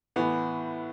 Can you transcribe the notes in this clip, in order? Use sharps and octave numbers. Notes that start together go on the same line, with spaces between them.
A2 E3 B3